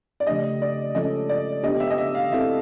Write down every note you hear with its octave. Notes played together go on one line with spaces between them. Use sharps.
D5
C#3 F3 A3 D4 G4 D#5
D5
F3 G#3 C#4 F4 A4 D#5
D5
B3 D4 G4 D#5
E5
D#5
E5
F5
C4 E4 A4 E5